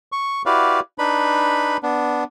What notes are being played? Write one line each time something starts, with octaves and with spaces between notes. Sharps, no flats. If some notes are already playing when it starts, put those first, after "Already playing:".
C#6
E4 F#4 G4 B4 D5 F5
D4 D#4 B4 B5
B3 D4